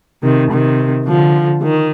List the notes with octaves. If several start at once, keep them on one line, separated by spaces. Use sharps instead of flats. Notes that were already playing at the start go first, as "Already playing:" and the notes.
C3 D#3
C3 D#3
D3 F3
D#3